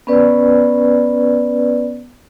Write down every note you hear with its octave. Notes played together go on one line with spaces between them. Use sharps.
B3 C#4 B4 D5